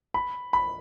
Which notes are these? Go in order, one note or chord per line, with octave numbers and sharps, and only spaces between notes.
B5
B5